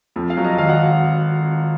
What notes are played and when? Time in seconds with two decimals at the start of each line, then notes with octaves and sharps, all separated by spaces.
0.16 F2
0.30 F5
0.37 F#3
0.44 D#5
0.58 G#1 F5
0.69 F#5